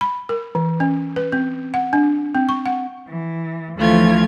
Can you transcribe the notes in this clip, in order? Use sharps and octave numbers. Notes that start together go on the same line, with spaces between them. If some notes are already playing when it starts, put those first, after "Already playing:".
B5
A#4
E3
C#4
B4
C4
F#5
D4
C4
C#6
F#5
E3
D2 E3 F3 A3 F4 G#6